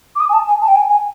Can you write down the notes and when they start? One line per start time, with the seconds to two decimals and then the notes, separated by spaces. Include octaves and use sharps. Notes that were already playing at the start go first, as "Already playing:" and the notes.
0.16 D6
0.20 D#6
0.29 G#5
0.33 A5
0.48 G#5
0.61 A5
0.68 G5
0.75 G#5
0.89 G#5